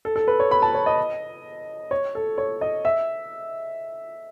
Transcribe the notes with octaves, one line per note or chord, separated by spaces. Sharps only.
A4
A4
B4
C#5
B5
A5
C#5
D#5
C#5
A4
C#5
D#5
E5